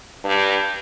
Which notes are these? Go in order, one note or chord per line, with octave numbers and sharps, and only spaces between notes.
G2